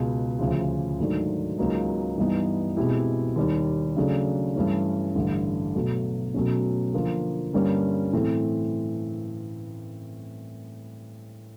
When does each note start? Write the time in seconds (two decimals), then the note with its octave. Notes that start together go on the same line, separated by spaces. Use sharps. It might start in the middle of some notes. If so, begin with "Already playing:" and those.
Already playing: C#2 B2 G#3
0.39 D2 C#3 F3
0.99 G#2 D#3 F#3 A3 D4
1.58 C#2 C#3 F#3 A#3 D#4
2.18 G2 E3 G3 B3 D#4
2.77 B2 G#3 C4 E4 G4
3.36 D#2 D#3 G3
3.96 C#3 F#3 A3 D4
4.56 G2 E3 A3 C#4
5.15 A1 G2 D3
5.75 B2 F#3 A3
6.34 B2 F#3 A3 C#4
6.94 D3 F3 A#3
7.53 G2 D3 G3 A#3 C#4
8.13 A2 E3 A3 C4